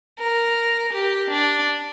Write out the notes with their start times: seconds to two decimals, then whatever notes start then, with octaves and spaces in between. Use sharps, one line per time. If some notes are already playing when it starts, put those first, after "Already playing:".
0.19 A#4
0.93 G4
1.30 D4